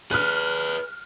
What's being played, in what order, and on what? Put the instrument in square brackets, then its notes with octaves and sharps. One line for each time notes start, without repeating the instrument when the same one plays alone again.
[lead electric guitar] G#4 B4 [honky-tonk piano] F6 F#6